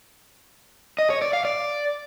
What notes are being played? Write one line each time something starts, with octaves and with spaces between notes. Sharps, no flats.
D#5
C#5
D5
F5
D5